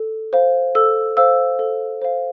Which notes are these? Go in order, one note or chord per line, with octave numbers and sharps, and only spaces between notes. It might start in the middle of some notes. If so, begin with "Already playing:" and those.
Already playing: A4
C5 F5
A4 E6
C5 F5 E6
A4
C5 F5